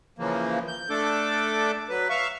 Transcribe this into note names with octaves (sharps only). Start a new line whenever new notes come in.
C#3 E3 F3 A#3
G6
A3 D4 A4 D6
F#3 B4
E5 F5 C#6